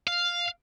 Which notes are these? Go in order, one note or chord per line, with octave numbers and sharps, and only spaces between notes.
F5